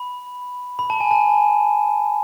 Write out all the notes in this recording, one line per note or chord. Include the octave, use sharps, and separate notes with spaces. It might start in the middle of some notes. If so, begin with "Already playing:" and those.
Already playing: B5
B5
A5
G#5
A5